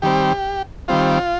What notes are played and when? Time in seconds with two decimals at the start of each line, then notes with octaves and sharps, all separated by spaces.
0.02 D#3 G3 C4 G4
0.88 D#3 G3 C4 F4